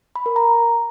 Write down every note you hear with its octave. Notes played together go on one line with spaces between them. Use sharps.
B5
A#4
A#5